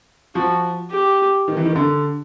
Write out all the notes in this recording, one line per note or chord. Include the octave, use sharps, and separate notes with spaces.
F3 F#4
G4
D#3
E3
D#3
D3